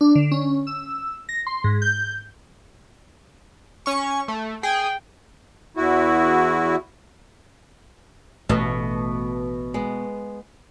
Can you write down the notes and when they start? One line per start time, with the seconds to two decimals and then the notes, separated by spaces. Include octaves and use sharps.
0.01 D4
0.15 D3
0.32 C#4
0.67 E6
1.29 A#6
1.47 C6
1.64 G#2
1.82 G6
3.86 C#4 C#6
4.28 A3
4.63 G#4 G5
5.77 E2 E4 F#4
8.49 A1 B2 A3
9.74 G#3 B3